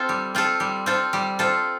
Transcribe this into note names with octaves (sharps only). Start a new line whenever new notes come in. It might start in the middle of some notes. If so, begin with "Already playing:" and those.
Already playing: C4 F4 A4
G3
C4 F4 A4
G3
C4 F4 A4
G3
C4 F4 A4